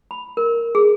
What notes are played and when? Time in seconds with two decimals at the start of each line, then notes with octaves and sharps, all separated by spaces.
0.11 B5
0.37 A#4
0.75 G#4